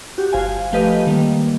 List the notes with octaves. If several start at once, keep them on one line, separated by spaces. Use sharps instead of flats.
F#4 G4
G1 F4 C5 F5 G#5
F3 A3 G4 B4 D#5 F5
D#3 G3 A#3